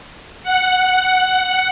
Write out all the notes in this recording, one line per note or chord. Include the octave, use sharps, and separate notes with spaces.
F#5
F#5